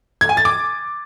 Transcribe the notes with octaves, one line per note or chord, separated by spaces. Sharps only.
G#6
G#5
A6
D6